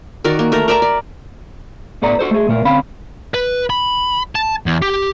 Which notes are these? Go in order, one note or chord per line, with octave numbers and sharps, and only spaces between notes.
D#3 F#4 A#4 D5
A#3
A3 A#4
A#4 D5 E5 A#5
D5
A2 B3 A4 D5 A#5
F#4 A4 C5
A3 G#4
A#2 A3 A#4
D2 C4 C#4 F5 B5
B4
B5
A5
E2
G4